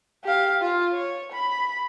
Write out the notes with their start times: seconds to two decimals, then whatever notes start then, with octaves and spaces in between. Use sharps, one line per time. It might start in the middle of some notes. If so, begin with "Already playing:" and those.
0.24 G4 F5
0.61 F4
0.93 C#5
1.33 B5